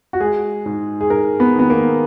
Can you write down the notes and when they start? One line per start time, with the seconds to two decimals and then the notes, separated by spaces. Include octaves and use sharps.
0.13 F#4
0.20 G#3 G#4
0.66 G#2
1.01 G#4
1.10 G#2 A#4
1.40 B3
1.55 D#3 B3
1.70 A#3